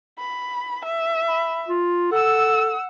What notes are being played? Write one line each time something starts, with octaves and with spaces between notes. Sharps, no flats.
B5
E5
B5
F4
A4 F#5 E6